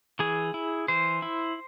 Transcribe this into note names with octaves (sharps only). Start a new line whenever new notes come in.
E3 G#4
E4
E3 C5
E4